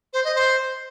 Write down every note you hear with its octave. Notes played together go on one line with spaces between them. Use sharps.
C5
D#5
C5